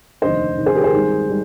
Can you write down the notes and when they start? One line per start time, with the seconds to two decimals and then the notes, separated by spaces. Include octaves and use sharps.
0.22 F1 D#2 D3 C5 D#5
0.57 F1 D#2 D3
0.66 G#4 C5
0.75 G4 A#4
0.84 G#4 C5
0.93 G#1 G#2 D#3 G3
1.28 D#3 G3